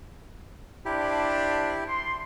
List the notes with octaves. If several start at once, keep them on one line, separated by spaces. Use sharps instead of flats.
D4 E4 G4 C5 A5
C6